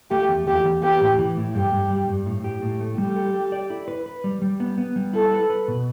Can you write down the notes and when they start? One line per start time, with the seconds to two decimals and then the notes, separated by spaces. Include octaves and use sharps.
0.10 A3 G4
0.29 E2
0.47 E2 G4
0.65 E2
0.82 B3 G4
1.01 A2
1.19 E3
1.37 A2
1.54 G2 G4
1.72 G2
1.90 G3
2.08 G2
2.26 A2
2.44 G4
2.62 A2
2.80 A3
2.98 G3 G4
3.16 A4
3.34 A4
3.52 D5
3.70 E4
3.88 B4
4.06 B4
4.24 G3
4.42 G3
4.60 B3
4.78 B3
4.96 G3
5.13 E4 A4
5.32 B4
5.50 B4
5.68 B2